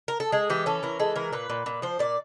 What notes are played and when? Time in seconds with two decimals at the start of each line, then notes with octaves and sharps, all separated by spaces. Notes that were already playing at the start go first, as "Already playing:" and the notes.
0.08 A#4
0.20 A4
0.32 G#3 G#4
0.50 E3 G4
0.66 C#4 A4
0.83 E3 A#4
1.00 G#3 A4
1.16 E3 A#4
1.33 A#2 B4
1.50 A#2
1.66 A#2
1.82 F3 C5
1.99 A#2 D5